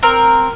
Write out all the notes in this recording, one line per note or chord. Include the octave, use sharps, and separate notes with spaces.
C4 A#4